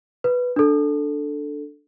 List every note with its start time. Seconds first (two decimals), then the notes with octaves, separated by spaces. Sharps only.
0.24 B4
0.56 D4 A4